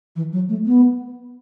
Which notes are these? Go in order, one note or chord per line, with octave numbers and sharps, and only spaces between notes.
E3
F#3
A3
B3